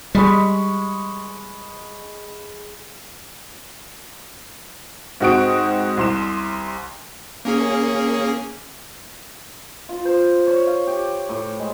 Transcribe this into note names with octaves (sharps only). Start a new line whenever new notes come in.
G3 G#3 B5 C#6
G#2 C4 F#4 C#6 D#6 D7
C2 C6 E7
A#3 C#4 G#4
F4
C5
C#5
F5
G4
A2
G#3